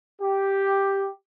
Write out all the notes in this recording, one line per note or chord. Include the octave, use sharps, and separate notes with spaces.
G4